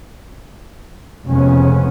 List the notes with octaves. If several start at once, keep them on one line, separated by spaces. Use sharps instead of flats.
F1 F2 C#3 G#3 B3 C#4